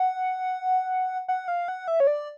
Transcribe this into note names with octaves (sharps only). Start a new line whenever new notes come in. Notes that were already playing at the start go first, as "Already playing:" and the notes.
Already playing: F#5
F#5
F5
F#5
E5
C#5
D5